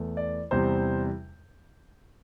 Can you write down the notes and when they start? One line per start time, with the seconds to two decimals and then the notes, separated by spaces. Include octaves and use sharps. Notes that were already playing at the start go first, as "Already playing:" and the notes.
Already playing: E2 E3 A3
0.17 D5
0.51 E2 C3 G3 C5